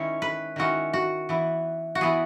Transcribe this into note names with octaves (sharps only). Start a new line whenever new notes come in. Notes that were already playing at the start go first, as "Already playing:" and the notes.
Already playing: D#3 G#3 C#4 E4 C#5
B4
D#3 G#3 C#4 E4 F#4
F#4
E3 B3 E4
F#4
E3 B3 E4 G#4